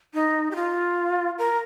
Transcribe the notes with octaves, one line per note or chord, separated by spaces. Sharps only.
D#4
G4
F4
A#4